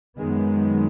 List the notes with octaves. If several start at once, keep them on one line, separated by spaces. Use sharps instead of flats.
F#2 D#3 G#3 B3